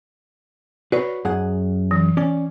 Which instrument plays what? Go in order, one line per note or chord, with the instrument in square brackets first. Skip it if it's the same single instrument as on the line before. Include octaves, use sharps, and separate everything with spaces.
[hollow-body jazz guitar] F#4 B4 C#5 [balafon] D5
[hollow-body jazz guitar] F#2 G#4 F#5
[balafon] E3
[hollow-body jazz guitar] C#4 D5